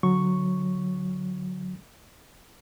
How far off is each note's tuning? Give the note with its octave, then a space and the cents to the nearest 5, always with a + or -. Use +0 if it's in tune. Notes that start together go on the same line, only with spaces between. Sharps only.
D3 -15 F#3 -10 C#6 +0